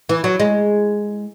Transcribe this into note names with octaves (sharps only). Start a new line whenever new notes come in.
E3
F#3
G#3